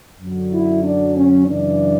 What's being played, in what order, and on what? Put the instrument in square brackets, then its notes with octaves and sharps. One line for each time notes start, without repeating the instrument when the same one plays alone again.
[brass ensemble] F#2 D3 F#3
E4
D4
C#4
F#2 C#3 E3 D4